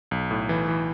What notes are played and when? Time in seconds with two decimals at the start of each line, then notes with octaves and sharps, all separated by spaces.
0.11 B1
0.31 A2
0.49 E3
0.68 E3